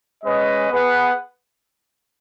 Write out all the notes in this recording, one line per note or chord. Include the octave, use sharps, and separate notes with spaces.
G#3 C#4 B4 D#5
B3 G#4 B4 F#5